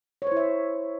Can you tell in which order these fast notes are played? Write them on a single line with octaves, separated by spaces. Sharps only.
C#5 C5 E4 E5